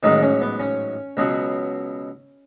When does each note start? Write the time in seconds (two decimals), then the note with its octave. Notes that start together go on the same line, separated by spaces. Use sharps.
0.03 A1 G#2 D#3 F#3 D#4
0.22 C#4
0.42 B3
0.60 C#4
1.17 C#2 B2 F#3